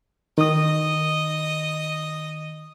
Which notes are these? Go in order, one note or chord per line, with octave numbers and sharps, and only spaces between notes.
D#3 D#5 D#6